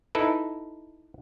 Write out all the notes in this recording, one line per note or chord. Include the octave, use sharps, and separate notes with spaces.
D#4 E4 A4 B4